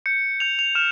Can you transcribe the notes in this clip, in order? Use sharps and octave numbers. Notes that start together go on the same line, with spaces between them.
G6 C#7
G6 F7
F7
F6 E7